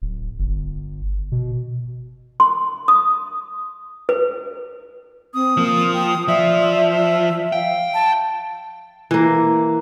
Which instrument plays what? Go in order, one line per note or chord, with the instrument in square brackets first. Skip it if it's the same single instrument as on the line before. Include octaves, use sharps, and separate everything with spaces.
[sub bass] D1
G1
B2
[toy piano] C6
D#6
B4
[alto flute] C4 [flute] D#6
[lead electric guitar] F3 [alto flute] A#3
[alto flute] G5
[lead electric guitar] F3 [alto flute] D5 [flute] E5
[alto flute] F5 [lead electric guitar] G5
[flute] A5
[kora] E3 A#3